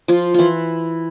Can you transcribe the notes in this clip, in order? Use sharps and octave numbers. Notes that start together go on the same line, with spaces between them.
F3 F4
E3 E4 F4